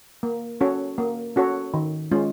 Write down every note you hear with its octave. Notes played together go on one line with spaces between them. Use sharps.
A#3
C#4 F#4 A4 C#5
A#3
C#4 F#4 A4 C#5
D#3
G#3 C#4 F4